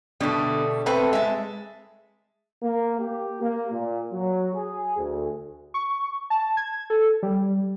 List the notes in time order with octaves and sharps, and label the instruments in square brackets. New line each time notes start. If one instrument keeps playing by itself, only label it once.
[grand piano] B2 D3 [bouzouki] G3 A3
[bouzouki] A3 C4 A4 [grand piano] B4
[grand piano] G#3 [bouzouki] E5 A5
[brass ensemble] A#3
G4
A#3
A#2
F#3
G#4
D2
[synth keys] C#6
A5
G#6
A4
G3